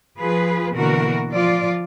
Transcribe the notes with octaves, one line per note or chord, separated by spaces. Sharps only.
F3 F4 G#4 B4
B2 D3 E3 A#3 F#4 A#4
F3 F4 D5